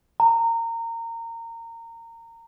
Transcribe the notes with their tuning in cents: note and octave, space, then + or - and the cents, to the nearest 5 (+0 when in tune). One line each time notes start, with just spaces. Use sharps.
A#5 -25